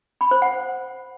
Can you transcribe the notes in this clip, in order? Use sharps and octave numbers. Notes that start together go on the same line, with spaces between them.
B5
C5
F#5